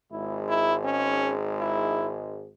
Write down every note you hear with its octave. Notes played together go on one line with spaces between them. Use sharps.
G#1 G#2 G#3 E4
E4
C#4
E4